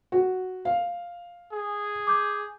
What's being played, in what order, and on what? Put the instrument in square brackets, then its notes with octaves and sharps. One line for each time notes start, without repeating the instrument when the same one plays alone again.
[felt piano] F#4
F5
[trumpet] G#4
[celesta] D6 G6